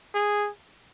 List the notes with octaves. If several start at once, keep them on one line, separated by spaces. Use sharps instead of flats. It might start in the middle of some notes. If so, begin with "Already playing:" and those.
G#4